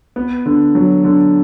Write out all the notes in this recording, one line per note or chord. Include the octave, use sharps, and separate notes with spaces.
B3
D3
F#3
D3